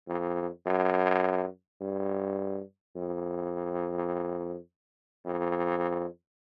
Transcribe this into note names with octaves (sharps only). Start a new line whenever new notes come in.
F2
F#2
G2
F2
F2